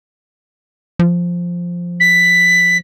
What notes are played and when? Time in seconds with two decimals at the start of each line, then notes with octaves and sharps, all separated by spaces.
0.99 F3
2.00 B6